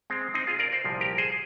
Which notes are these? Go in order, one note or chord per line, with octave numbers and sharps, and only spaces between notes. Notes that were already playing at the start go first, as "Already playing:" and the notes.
G#3 C4
C4 D#4
F4 G#4
A#4 D5
C5 D#5
C2 A#2 F3
G4 A#4
G#4 C5